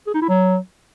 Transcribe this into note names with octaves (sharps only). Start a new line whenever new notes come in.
G#4
D#4
E4
F#3